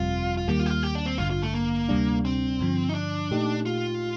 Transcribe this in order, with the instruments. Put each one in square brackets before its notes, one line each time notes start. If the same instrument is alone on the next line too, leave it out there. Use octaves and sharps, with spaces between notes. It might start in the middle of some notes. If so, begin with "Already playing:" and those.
Already playing: [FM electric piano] G1 F2 C3 G3 C4 [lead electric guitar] F4
[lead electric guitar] F4
[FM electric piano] D#2 D#3 G3 A#3 [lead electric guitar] G4
[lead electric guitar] F4
G4
F4
G4
D4
C4
[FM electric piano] A1 G2 D3 [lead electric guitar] F4
[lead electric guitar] F4
A3
A#3
[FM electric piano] D2 C3 G3 D4
[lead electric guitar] C4
[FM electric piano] G2 D3 F3
[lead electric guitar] D#4
D4
[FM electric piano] A#2 A3 D#4 G4
[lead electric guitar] F4